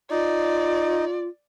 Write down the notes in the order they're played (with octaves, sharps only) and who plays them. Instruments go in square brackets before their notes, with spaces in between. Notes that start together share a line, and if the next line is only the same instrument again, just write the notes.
[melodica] D#4 [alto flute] F4 [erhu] D5